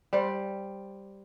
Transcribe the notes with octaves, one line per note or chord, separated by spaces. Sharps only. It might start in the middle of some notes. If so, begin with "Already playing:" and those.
G3 C5